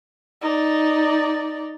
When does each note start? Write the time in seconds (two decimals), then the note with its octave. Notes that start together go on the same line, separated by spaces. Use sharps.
0.41 D#4 D5